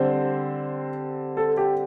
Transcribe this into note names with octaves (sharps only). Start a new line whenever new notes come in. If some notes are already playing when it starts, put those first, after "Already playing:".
Already playing: D3 G3 C4 C5
A4
G4